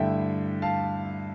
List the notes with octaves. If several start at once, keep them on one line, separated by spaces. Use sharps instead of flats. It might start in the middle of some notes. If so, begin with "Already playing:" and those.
Already playing: G2 D3 A3 E4 E5 G5
F5 A5